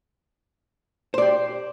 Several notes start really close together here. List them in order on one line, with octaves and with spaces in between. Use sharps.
C5 D5 G4